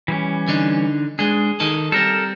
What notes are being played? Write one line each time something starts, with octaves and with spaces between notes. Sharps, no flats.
E3 G3 C#4
D3 D4 D#4
G#3 D4 G#4
D#3 D#4 A4
G3 C4 A4 A#4